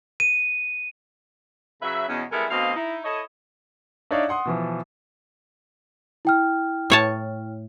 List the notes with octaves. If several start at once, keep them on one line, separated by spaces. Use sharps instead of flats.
D#7
C#3 F#3 B4 E5
E2 B2 C#4
G3 G#3 B3 E4 A4 A#4
D2 B2 C4 D#5 F5
D#4 E4
E4 A4 C#5 D#5
D4 D#4 C#5 D5 E5 F5
F#5 C6 D#6
B2 E3 F3
E4 G5 F6
A2 C#5 A5